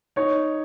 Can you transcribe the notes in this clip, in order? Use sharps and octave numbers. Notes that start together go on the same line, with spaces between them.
D#4 C#5